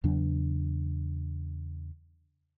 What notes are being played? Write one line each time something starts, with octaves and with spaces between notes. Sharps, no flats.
E2 C#3 F#3 D4